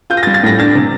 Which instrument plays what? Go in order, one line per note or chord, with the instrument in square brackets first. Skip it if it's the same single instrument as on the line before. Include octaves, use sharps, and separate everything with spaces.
[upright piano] F4 G6
A#6
A6
G3
A6
A2 A#6
D4 A6
C3